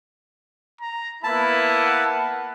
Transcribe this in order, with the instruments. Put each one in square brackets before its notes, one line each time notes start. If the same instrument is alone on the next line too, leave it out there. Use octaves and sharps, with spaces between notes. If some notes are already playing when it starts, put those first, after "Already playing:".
[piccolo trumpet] A#5
[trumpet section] A#3 B3 E4 [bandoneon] A5 [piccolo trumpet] B5
[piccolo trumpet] F#5